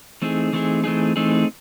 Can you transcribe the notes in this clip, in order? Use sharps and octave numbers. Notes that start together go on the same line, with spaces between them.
E3 A3 C4 D#4 G#4
E3 A3 C4 D#4 G#4
E3 A3 C4 D#4 G#4
E3 A3 C4 D#4 G#4